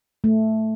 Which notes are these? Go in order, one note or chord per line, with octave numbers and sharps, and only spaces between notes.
A3